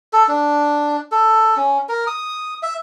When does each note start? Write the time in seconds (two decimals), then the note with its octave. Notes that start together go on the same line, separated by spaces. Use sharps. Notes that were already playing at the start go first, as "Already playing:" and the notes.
0.13 A4
0.28 D4
1.12 A4
1.57 C#4
1.89 A#4
2.07 D#6
2.63 E5